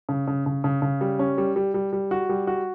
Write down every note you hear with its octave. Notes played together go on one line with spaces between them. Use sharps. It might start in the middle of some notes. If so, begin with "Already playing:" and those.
C#3
C#3
C#3
C#3
C#3
G3
C#4
G3
G3
G3
G3
F#4
G3
F#4